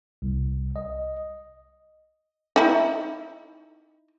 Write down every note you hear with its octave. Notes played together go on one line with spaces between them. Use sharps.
C2
D#5
D#4 E4